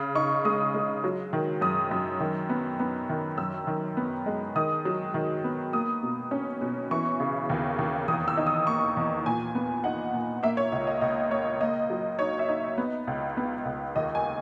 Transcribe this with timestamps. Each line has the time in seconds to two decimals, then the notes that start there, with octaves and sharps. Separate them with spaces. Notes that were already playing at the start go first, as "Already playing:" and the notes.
Already playing: C#3
0.15 D#4 C#6
0.45 G#3 D#6
0.74 G#3
1.04 F#3
1.33 D#3
1.61 F#2 D#6
1.91 F#2
2.20 D#3
2.49 B3
2.80 B3
3.09 D#3
3.38 F#2 E6
3.67 D#3
3.97 B3
4.26 G#3
4.56 D#3 D#6
4.85 F#3
5.14 D#3
5.44 B3
5.73 A#3 D#6
6.03 B2
6.31 C#4
6.61 B2
6.91 E3 C#6
7.20 C#3
7.50 D#2
7.79 D#2
8.08 E2 D#6
8.28 E6
8.37 D#4
8.47 D#6
8.67 A#3 C#6
8.97 E2
9.26 A#2 G#5
9.55 B3
9.84 D#4 F#5
10.13 A#2
10.43 A#3 E5
10.57 C#5
10.72 C#2 D#5
10.87 D#5
11.01 C#2 D#5
11.30 A#3 C#5
11.61 A#3 D#5
11.90 F#3
12.19 D#4 C#5
12.39 E5
12.48 D#4
12.78 B3
13.07 C#2
13.37 B3
13.65 C#2
13.96 D#2 D#5
14.15 G#5